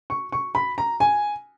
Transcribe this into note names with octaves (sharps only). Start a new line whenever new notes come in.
C#6
C#6
B5
A#5
G#5